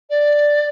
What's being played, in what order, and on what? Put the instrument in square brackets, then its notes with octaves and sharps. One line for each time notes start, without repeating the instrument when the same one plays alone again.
[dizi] D5